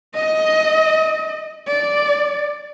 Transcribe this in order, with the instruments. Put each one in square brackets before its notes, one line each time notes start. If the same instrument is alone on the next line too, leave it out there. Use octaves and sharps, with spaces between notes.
[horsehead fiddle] D#5
D5